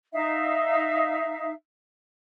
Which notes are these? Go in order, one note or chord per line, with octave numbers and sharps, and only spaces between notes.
D#4 E5 F5